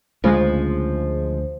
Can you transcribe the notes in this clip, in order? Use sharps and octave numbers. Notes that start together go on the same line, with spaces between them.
D2 C#3 F3 G#3